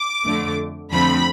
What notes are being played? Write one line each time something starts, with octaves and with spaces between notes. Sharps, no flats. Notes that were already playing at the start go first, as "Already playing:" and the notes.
Already playing: D6
F2 D3 A3
F2 D3 F3 A3 C4 B5